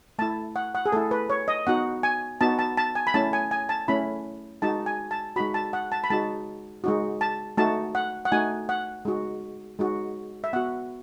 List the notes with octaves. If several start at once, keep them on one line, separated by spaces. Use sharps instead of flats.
A3 E4 A5
F#5
F#5
G#4
A3 E4 A4
B4
C#5
D#5
B3 D#4 F#4 F#5
G#5
B3 D#4 F#4 A5
A5
A5
G#5
B5
A3 C#4 E4 A5
G#5
G#5
A5
A3 C#4 E4 B5
G#3 D#4 F#4 A5
G#5
A5
G#3 D#4 F#4 B5
A5
F#5
A5
B5
G#3 D#4 F#4 A5
G#3 D#4 F#4
A5
A3 D#4 F#4 A5
F#5
F#5
A3 D#4 F#4 G#5
F#5
G#3 D#4 F#4
G#3 D#4 F#4
E5
B3 F#4 F#5